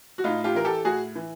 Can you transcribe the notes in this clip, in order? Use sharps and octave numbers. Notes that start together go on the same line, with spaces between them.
F#4
A2 D#4 F4
F4 G4
E3 A#4
G4 A4
A2 F#4 G#4
E3